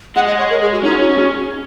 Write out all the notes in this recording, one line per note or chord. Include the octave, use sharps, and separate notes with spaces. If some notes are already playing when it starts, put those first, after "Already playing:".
G#3 F#5
D#5
C#5
A#4
G#4
F#4
C#4 D#4
F#4
D#4
F#4
C#4 G#4